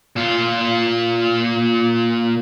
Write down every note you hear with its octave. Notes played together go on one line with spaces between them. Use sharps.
A#2 F4